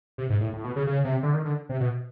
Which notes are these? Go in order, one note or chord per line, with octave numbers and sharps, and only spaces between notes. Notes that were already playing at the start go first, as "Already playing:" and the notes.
C3
G#2
A2
A2
B2
C#3
C#3
C3
D3
D#3
D3
C3
B2